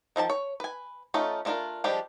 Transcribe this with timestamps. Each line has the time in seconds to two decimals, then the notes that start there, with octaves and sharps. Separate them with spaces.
0.16 D#3 F3 F4 A5
0.30 C#5
0.60 B4 G#5
1.14 A3 C#4 D#4 F4 A4
1.45 A3 D4 F4 G#4 A#4
1.84 F3 G3 G#3 D4 G4